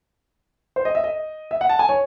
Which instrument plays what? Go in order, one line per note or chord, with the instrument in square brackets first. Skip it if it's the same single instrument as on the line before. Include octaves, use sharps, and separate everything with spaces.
[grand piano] C5
D#5
E5
D#5
E5
F#5
A5
G#5
C#5